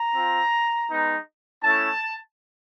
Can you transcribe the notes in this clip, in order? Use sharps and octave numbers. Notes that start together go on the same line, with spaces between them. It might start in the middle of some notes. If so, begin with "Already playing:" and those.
Already playing: A#5
C4 F4
G#3 B3 D#4
A3 C#4 E4 A5